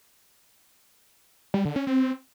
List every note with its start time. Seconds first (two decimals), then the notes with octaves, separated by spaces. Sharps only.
1.54 G3
1.65 D3
1.76 C#4
1.87 C4